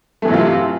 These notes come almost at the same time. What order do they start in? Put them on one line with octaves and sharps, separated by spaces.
A3 E3 F#3 C3 F4